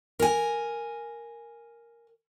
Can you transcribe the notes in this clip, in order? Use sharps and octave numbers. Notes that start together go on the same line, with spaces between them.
A#4 G#5